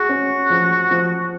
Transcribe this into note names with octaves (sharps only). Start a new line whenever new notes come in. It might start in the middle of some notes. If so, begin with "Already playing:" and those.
Already playing: F#4 G#4
C#4
F3
F3